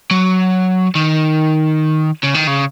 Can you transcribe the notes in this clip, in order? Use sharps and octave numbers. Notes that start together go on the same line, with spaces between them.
F#3
D#3
C#3
D#3
C#3